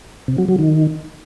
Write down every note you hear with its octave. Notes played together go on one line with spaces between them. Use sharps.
C3
F#3
F#3
D#3